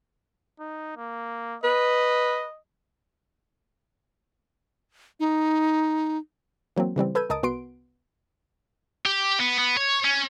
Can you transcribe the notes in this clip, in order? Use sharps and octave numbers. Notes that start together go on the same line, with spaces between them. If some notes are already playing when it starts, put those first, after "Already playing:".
D#4
A#3
B4 D#5
D#4
E3 F#3 A#3 C4
C#3 E3 G3 C4
A4 B4 E6 G6 G#6 D#7
C#2 A#4 D#5 A5 D#6 D7
C2 B3 F#4 C6 D7
G4
B3
B3
C#5
C#4